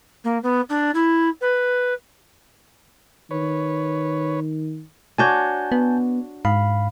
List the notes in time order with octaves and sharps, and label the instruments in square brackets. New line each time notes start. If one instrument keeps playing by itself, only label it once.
[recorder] A#3
B3
D4
E4
B4
[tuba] D#3 [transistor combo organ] B4 C#5
[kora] D4 F#4 C#5 [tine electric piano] G#5 A5 G6
[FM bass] B3
[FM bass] G#2 [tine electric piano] F5 B5